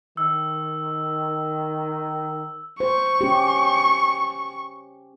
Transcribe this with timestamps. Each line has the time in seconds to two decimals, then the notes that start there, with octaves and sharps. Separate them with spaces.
0.17 D#3 E6
2.80 C5 C#6
3.21 C#4 G4